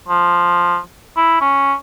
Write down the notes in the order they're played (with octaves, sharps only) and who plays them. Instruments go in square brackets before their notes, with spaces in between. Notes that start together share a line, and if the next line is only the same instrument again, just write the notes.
[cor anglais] F3
E4
C#4